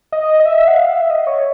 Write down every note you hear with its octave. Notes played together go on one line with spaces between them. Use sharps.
D#5
D#5
E5
F#5
F5
E5
D#5
C#5